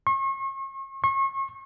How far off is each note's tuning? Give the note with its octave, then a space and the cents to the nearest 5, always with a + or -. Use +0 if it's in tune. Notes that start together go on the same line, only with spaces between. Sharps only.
C#6 -40
C#6 -35